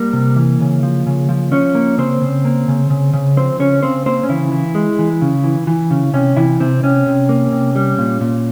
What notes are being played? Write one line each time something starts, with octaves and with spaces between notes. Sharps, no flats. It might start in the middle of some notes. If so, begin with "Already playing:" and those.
Already playing: G3 A#3 A#4
C3
E3
C#3
F3
C#3
F3
F3 C#4 C#5
A#3
C#3 C4 C5
C#3
A#3
C#3
C#3
C#3
F3 C4 C5
C#3 C#4 C#5
C#3 C4 C5
A#3 C4 C5
C#4
C#3 E3 E4
E3
G#3
E3
C#3
E3
E3
C#3
C3 C#4
C3 E3 E4
C3 C4
C3 C#4
C3
A#3
C3
G3
A#2
A#2